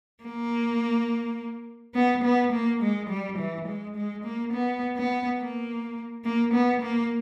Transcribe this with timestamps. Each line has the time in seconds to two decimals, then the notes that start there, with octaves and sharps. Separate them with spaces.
0.24 A#3
1.95 B3
2.24 B3
2.52 A#3
2.82 G#3
3.10 G3
3.38 E3
3.68 G#3
3.96 G#3
4.24 A#3
4.53 B3
4.96 B3
5.39 A#3
6.25 A#3
6.54 B3
6.82 A#3